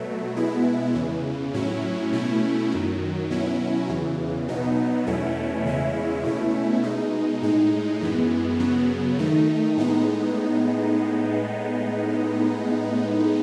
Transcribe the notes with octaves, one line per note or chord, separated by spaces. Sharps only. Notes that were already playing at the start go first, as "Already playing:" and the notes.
Already playing: B2 F#3 A3
B2 G#3 B3 E4
E2 C#3 E3
A2 F#3 C#4 E4
B2 A3 C#4 E4
F#2 D#3 F#3
B2 F#3 C#4 E4
E2 C#3 E3
B2 F#3 B3 D#4
E2 B2 A3 C#4 E4
E2 C#3 G#3 C#4 E4
B2 A3 C#4 E4
B2 G#3 D#4
A2 G#3 D#4
F#2 E3 G#3 B3
F#2 C#3 F#3 B3
D#3 A3 D#4
A2 G#3 B3 D#4